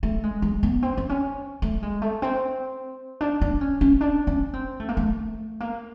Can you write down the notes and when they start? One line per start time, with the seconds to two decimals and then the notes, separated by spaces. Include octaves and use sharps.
0.03 A3
0.23 G#3
0.42 G#3
0.63 B3
0.83 C4
0.97 C4
1.09 C#4
1.62 A3
1.83 G#3
2.02 A3
2.22 C4
3.21 D4
3.41 D4
3.61 C#4
3.81 C#4
4.01 D4
4.27 C#4
4.53 C4
4.80 A3
4.89 A#3
4.97 A3
5.60 A#3